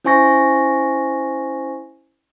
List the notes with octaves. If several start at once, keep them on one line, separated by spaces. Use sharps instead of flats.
C#4 E4 C5 G#5 C#6 A#6